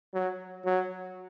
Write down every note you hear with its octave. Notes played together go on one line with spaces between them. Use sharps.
F#3
F#3